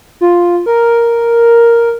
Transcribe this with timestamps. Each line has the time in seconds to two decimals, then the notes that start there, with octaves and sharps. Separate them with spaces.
0.21 F4
0.66 A#4